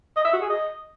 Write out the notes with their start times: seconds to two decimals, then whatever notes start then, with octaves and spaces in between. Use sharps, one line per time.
0.17 D#5
0.25 E5
0.33 F#4
0.41 G#4
0.50 D#5